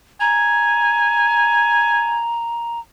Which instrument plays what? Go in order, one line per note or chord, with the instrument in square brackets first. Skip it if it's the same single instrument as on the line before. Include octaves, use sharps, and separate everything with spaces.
[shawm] G#5 [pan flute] A#5